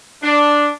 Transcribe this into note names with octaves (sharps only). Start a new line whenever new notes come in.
D4